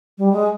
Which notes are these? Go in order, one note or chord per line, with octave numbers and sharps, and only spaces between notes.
G3
G#3